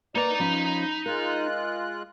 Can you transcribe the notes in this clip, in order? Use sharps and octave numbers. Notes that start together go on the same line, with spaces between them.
A#3 D#4 B4 D5 D#5 A#5
F3 C#4 B5
G#3 F4 A#4 F#6